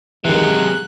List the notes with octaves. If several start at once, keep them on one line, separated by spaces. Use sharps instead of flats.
C3 D#3 E3 F#3 G#3 F#6